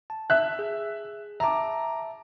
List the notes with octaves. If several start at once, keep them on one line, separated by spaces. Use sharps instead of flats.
A5
E5 F#6
G#4
E5 A5 A#5 D6